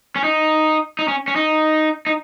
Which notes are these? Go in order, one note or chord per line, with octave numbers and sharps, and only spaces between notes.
C#4
D#4
D#4
C#4
C#4
D#4
D#4